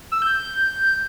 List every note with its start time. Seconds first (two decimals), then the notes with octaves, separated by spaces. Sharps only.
0.12 E6
0.22 G6